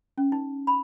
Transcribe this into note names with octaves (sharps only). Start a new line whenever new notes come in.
C#4
D#4
B5